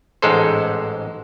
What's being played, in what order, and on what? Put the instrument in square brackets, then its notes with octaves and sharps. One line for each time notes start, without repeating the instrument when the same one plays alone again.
[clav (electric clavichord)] A1 G#2 G#3 A4 C5